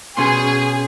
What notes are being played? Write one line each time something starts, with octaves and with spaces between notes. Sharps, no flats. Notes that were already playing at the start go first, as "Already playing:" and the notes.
B2 C#4 G#4 C6